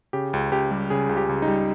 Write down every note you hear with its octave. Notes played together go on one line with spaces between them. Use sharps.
C#3 G4
C#2
C#2 G4
G3
C#3 G#4
C#2
G4
C#2
D#4
G3